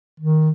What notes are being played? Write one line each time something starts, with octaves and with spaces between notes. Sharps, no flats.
D#3